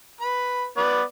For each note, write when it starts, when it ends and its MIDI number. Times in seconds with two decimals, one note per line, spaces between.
0.20 0.67 71
0.20 0.67 83
0.77 1.02 59
0.77 1.02 71
0.77 1.02 74